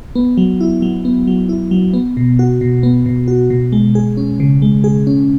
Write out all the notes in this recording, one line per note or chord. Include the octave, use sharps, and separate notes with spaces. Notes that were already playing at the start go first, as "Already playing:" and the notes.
B3
F#3
E4
F#3
B3
F#3
E4
F#3
B3
B2
F#4
B2
B3
B2
F#4
B2
G#3
G#4
C#4
C#3
G#3
G#4
C#4